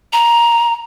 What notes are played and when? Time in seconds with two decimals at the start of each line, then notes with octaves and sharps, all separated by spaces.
0.13 A#5